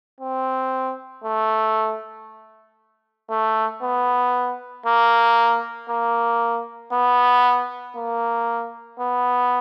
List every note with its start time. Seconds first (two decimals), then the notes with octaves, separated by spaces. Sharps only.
0.20 C4
1.24 A3
3.30 A3
3.82 B3
4.86 A#3
5.89 A#3
6.93 B3
7.96 A#3
8.99 B3